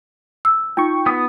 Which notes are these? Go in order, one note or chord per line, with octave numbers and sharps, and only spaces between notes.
E6
D#4 F4 G5 C#6
B3 D#6